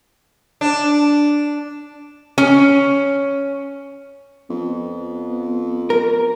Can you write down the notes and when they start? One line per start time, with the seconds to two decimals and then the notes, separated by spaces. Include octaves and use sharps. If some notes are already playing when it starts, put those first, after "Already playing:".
0.61 D4
2.38 C#4
4.50 F2 B3
5.90 A#4